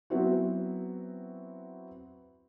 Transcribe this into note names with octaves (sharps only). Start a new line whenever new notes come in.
F#3 B3 C4 E4 F#4